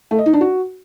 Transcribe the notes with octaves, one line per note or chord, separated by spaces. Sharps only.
A3
D#5
D#4
D4
F#4